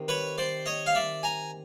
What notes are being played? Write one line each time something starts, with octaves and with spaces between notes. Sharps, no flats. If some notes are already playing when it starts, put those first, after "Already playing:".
Already playing: C3 D#3
B4 C#5
C5 D5
C#5 D#5
F5
D5 E5
G#5 A#5